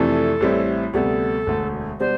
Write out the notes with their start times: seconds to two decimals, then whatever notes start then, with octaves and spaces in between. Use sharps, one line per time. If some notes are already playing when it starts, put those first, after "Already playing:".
Already playing: F2 C3 E3 A3 D4 A4
0.40 A1 A2 G3 C4 E4
0.93 D2 C3 G3 B3 A4
1.46 E1 D2 D3 A3
2.00 B2 G3 D4 C5